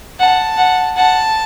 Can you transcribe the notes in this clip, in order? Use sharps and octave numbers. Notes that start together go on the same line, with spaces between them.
F#5 A5
F#5
F#5 A5